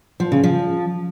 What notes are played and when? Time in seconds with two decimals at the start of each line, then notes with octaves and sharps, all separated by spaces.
0.20 F3
0.32 C#3
0.44 F3